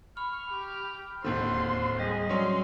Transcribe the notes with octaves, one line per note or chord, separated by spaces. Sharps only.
B5 C#6 F6
G4
D1 D#2 D3 C5 C6
G3 G#4 D#5
F#3 C#4 D4 C6